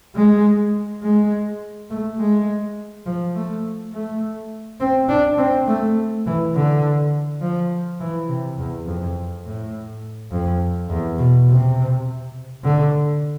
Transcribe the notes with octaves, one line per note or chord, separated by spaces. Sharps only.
G#3
G#3
A3
G#3
F3
A3
A3
C4
D4
C4
A3
E3
D3
F3
E3
C3
E2
F2
A2
F2
E2
B2
C3
D3